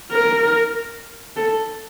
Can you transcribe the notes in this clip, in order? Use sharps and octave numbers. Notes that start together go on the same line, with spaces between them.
A#4
A4